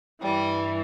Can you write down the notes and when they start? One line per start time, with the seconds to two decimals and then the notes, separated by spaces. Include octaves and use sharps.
0.21 G2 E3 G3